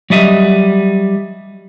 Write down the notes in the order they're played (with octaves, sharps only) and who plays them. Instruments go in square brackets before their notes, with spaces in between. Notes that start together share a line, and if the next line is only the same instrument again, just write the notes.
[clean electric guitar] F#3 G3 D#5 E5